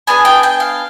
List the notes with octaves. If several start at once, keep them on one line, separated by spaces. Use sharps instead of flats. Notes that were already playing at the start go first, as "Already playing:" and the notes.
B3 D4 G#4 G#5
G5
G5
F5